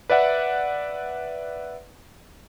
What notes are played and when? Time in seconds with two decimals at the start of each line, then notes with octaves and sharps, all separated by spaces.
0.10 B4 D5 E5 F#5